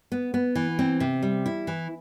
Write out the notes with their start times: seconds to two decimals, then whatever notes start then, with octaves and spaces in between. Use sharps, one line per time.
0.12 B3
0.34 B3
0.55 E3
0.79 C4
1.00 C3
1.22 G3
1.46 E4
1.67 E3